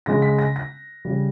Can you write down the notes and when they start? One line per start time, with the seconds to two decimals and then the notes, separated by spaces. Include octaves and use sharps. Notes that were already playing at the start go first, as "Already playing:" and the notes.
0.06 C#3 G#3 A#6
0.22 B6
0.39 A#6
0.56 A#6
1.05 C#3 G3